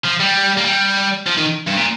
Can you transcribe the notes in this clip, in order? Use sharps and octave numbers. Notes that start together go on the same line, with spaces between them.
F3
G3
A#3
G3
F3
D#3
G2
A#2